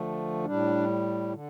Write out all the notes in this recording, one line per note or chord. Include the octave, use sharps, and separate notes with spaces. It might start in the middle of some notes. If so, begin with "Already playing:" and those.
Already playing: D3 F3 A3
A2 G3 D4
D3